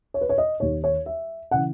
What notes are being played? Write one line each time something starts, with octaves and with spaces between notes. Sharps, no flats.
C#5
B4
C#5
D#5
D#2 D#3 C#5
C#5
E5
C#3 E3 F#5